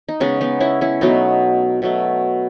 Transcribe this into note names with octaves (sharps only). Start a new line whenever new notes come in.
D#4
C#3 G#3 B3 C#4
B3 D#4
C#4 E4
C#4 E4
B2 F#3 A3 B3 D#4
B2 F#3 A3